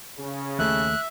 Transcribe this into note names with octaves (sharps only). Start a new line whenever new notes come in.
C#3
D#2 A3 E5 F#6